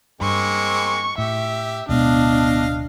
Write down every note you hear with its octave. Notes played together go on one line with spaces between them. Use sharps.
G2 G#3 A#3 C4 C#6
A2 G4 E5
D1 B2 G#3 B3 D4 D#5 F5